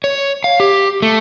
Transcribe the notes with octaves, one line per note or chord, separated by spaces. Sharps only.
C#5
F5
G4
A3